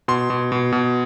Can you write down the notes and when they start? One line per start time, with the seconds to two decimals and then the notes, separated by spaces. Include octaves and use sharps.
0.08 B2 C6
0.30 B2
0.52 B2
0.72 B2